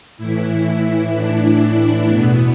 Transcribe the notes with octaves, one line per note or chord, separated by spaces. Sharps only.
A2 E3 E4
D4
E2 B2 B3